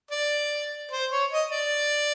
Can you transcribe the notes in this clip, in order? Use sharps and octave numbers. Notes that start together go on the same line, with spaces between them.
D5
C5
C#5
D#5
D5